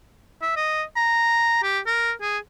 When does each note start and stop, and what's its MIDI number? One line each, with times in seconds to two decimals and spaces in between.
0.42 0.56 76
0.57 0.83 75
0.96 1.63 82
1.63 1.79 67
1.86 2.12 70
2.22 2.38 68